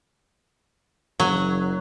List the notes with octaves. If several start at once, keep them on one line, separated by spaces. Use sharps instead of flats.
F#1 F#3